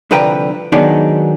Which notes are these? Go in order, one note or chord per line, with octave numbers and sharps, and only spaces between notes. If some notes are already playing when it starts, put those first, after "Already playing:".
C2 D3 F3 B4 G5 A#5
D#3 F#3 G#3 B3 D4 D#4